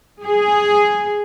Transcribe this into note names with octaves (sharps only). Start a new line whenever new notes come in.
G#4